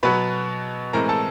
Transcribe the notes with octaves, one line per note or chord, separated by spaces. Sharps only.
B2 F#3 B3 B4 B5
A2 E3 G#3 C4 A#4 A#5
A4 A5